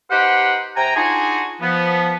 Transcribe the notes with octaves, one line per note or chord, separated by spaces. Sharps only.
D#4 G4 B4 C5 F#5
C3 G5 G#5 A#5
D4 D#4 F4 F#4 G#4 G#5
F3 B3